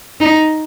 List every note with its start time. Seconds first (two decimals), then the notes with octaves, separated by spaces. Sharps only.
0.20 D#4